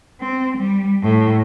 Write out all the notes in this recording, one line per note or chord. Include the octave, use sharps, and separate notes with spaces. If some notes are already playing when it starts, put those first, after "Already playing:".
C4
G3
A2